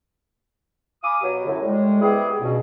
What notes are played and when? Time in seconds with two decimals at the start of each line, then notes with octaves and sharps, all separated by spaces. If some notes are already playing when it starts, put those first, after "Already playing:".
1.03 F5 G#5 B5 D6 D#6
1.22 B2 F#3 G4
1.47 F#2 A2 D3
1.62 A2 G3 G#3
2.01 C3 B3 E4 G4 G#4
2.40 C#2 G2 B2